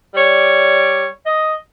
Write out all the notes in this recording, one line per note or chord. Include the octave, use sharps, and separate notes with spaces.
G3 C#5 D5
D#5